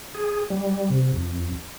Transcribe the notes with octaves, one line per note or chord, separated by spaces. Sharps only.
G#4
G3
C3
F2